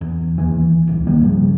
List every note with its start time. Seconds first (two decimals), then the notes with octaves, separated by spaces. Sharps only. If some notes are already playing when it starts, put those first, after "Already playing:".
0.01 E2
0.38 D#2 E3
0.88 D1 C2
1.07 C2 D#3 G3 A#3
1.21 G2 C#3 F3